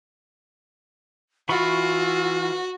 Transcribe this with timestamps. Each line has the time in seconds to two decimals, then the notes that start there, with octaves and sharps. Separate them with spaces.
1.49 E3 F4 F#4 B5 C#6